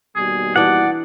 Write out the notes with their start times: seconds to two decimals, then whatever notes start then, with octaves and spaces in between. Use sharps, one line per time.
0.16 D#2 B2 G3 G#4
0.56 E3 D4 D5 F#5